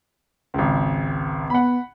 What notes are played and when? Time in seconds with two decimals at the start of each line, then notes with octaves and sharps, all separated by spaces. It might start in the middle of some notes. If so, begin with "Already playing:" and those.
0.54 G#1 C#2
1.50 B3 F#5 B5